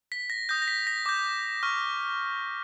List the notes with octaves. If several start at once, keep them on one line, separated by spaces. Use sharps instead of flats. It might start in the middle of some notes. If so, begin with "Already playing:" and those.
B6
A#6
D#6 G6 A#6
A#6
B6
A#6
D6 G6
C#6 F6